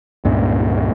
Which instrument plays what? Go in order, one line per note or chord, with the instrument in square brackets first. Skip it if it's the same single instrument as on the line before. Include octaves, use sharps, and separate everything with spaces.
[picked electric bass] C#2 G2 A#2 C#3